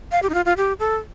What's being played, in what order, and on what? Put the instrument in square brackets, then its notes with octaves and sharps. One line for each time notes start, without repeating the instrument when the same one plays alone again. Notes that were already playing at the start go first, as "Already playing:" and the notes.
[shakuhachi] F5
G4
D#4
F4
F4
G4
A4